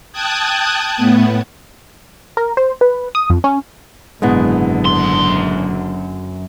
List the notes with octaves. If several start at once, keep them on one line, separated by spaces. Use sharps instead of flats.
G5 A5 D#6 F#6 G#6
A2 B3
A#4
C5
B4
D#6
F2
C#4
F#1 G#2 B2 D3 G#3 B3 E4
F#2 C6